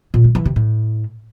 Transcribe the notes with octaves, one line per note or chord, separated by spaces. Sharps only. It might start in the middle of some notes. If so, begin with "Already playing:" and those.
A#2
G#3
E3
C3
A2